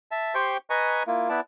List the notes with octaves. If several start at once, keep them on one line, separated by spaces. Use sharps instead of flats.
E5 A5
G4 C5 G5 C6 C#6
B4 D#5 G#5 A#5 C#6
A#3 E4 F4
B3 E4 D5 A5